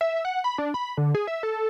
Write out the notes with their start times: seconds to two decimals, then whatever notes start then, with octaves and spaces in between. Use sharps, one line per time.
0.01 E5
0.25 F#5
0.44 B5
0.58 D4
0.74 B5
0.97 D3
1.15 G#4
1.27 E5
1.43 A4